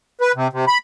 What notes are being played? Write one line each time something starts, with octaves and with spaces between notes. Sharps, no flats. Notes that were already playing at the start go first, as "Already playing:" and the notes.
B4
C3
C3
B5